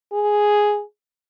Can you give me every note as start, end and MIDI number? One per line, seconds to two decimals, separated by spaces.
0.13 0.82 68